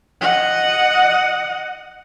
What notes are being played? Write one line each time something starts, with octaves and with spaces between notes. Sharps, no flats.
D#5 F#5